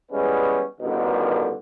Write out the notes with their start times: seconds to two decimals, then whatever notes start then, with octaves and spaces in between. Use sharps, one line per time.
0.12 E3 G3 G#3 B3 C#4 B4
0.81 A1 G2 B2 D3 D#3